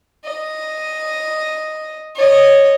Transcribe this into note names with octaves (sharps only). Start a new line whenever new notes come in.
D#5
C#5 D#5